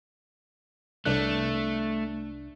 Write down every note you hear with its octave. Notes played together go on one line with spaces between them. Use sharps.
C2 A3 D4 F#6